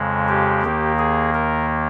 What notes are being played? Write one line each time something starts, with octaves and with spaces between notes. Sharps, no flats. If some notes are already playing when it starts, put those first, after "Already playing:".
Already playing: F2 C#3 G#3
G4
D#2 D#3 A#3
G#4
A#4